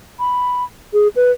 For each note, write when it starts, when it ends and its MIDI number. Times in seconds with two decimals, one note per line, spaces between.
0.19 0.64 83
0.93 1.08 68
1.16 1.32 71